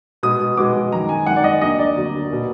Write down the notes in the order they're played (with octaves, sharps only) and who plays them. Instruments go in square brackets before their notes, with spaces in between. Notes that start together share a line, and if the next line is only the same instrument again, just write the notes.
[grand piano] B2 G#3 B3 D#6
B2 G#3 B3 D6
F#2 D#3 G#3 A#5
G#5
F#2 D#3 G#3 F#5
D5
D#5
D2 D3 F#3 A#3 D#5
D5
D2 D3 F#3 A#3
B2 A#3